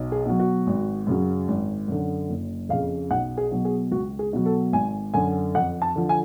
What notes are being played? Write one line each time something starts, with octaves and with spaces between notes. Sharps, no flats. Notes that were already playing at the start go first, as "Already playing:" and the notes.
Already playing: B1
G#4
B2 F#3
F#4
G#1
F#2 C#3 F#3
G#1
F#2 D3
F#1
F2 C#3 F5
B1 F#5
G#4
B2 F#3
G#4
C#2 F#4
G#4
B2 F#3
A4
G#1 G#5
F#2 D3 G#5
F2 F#5
A5
D3 F3
G#5